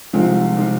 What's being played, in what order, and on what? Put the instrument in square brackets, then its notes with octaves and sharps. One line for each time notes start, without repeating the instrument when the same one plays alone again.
[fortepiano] C2 C3 D#3 [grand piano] F3 G#3
[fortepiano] C3 D#3